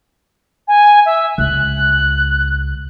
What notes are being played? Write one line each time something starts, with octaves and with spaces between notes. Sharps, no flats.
G#5
E5
C#2 F#6